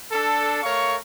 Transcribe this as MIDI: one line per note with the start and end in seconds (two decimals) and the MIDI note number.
0.12 0.62 62
0.12 0.62 69
0.63 0.96 57
0.63 0.96 70
0.63 0.96 73
0.63 0.96 77
0.63 0.96 85